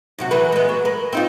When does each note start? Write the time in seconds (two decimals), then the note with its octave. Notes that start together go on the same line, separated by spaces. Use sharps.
0.18 F#2 C3 F#4
0.31 E3 F#3 B4
0.52 G#3 B3
0.69 F#3
0.85 A#4 B4
1.13 C4 D#4 F4